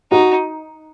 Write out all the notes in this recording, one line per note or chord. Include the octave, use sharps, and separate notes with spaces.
D#4 F#4